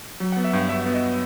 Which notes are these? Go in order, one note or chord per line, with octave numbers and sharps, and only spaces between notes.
F#3
F#5
B3
E5
G2 F#5
G2 E5
E5
B3
D#5